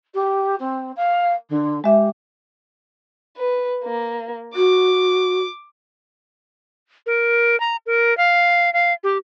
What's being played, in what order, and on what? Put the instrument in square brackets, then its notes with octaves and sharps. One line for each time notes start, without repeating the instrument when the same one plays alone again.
[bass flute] G4
C4
F5
D3
[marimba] G#3 E5 [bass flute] G4
[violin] B4
A#3
[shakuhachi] F#4 [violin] D6
[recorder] A#4
A#5
A#4
F5
F5
G4